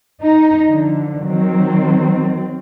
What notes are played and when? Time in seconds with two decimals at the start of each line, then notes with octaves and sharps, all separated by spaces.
0.22 D#4
0.69 D3 F3
1.25 D#3 F#3 C4